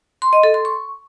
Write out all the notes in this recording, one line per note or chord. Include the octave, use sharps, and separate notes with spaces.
C6
D#5
A4
C6
C#6